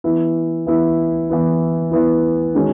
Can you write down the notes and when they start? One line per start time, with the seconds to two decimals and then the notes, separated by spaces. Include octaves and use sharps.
0.04 E3 B3 E4
0.67 E3 B3 E4
1.30 E3 B3 E4
1.91 E3 B3 E4
2.55 D#3 G#3 C#4 F#4